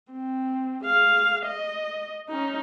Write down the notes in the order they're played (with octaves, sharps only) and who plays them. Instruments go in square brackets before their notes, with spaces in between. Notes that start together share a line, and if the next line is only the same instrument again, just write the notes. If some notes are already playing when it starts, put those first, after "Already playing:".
[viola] C4
G#4 F5
D#5
C#4 D#4